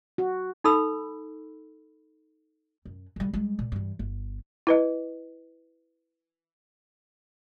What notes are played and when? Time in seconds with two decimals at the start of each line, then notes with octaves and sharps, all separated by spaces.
0.18 F#4
0.64 D#4 A4 B5 E6
2.85 F#2
3.16 D3 G3
3.33 G3 G#3
3.59 A#2
3.72 G2 E3
3.99 G1
4.67 E4 B4 D#5